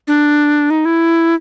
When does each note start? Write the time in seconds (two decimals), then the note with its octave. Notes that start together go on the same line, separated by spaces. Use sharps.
0.07 D4
0.70 D#4
0.85 E4